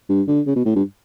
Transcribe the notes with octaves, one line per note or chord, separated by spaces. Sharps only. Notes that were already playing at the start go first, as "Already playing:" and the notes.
G2
D3
C#3
B2
A2
G2